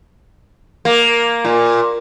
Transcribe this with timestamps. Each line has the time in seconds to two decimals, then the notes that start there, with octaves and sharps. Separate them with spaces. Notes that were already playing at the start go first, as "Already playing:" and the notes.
0.85 A#3
1.45 A#2